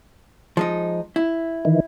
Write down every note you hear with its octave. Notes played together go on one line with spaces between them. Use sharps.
F3 G#3 D#4
E4
D#3 E3